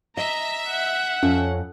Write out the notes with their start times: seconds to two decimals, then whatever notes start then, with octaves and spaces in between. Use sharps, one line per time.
0.17 D#5 E5 A#5
0.68 F#5
1.23 F2 C#4